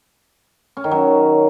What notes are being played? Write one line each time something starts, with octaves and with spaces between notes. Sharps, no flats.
C#4
D#3
F#3